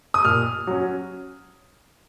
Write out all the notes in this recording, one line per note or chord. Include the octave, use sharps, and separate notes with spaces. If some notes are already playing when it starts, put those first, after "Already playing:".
D#6
A#2 F6
F#3 C#4